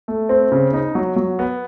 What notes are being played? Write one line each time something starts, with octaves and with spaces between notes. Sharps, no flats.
A3
C4
C#3
D#4
F#3
F#3
B3